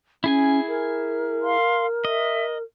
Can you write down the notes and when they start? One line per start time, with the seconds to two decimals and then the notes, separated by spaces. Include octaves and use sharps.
0.24 C#4 E4 G#4 G#5
0.68 A#4
1.42 F5 C6
2.05 D#5 E5